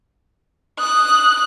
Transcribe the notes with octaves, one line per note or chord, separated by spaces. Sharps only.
D#6 F#6